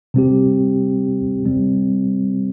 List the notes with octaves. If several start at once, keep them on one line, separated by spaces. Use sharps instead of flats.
C3 G3 C4 G4
C3 G3 C4